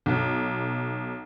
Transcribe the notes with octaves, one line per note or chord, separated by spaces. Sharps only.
B1